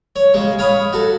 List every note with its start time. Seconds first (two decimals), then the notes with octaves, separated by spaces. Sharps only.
0.16 C#5
0.34 C#3 G#3
0.59 C#5 F5 B5 D#6
0.93 F#4 A4